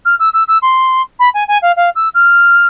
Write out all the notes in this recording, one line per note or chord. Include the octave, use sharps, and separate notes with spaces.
F6
E6
E6
E6
C6
B5
G#5
G#5
F5
F5
E6
F6